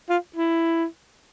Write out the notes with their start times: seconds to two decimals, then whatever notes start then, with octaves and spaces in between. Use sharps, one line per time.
0.09 F4
0.36 E4